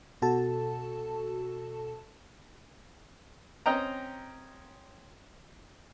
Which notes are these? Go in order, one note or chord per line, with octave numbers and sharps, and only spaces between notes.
B2 F#4 A4 A5
C4 C#4 D#5 G5 A#5